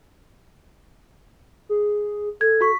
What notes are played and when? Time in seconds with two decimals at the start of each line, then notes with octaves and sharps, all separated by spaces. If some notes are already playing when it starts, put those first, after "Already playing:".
1.69 G#4
2.41 A4 G#6
2.61 F#4 C#6 B6